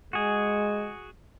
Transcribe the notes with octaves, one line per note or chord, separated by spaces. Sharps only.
G#3 F#4 G#4